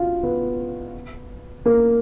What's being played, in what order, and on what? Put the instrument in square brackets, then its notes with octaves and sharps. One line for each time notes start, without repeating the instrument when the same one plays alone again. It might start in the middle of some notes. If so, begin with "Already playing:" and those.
Already playing: [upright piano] F4 F#4 F5
B3 B4
A#3 A#4